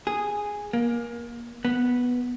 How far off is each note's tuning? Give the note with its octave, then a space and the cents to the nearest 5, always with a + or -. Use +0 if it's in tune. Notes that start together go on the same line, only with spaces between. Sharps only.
G#4 -5
A#3 +25
B3 -5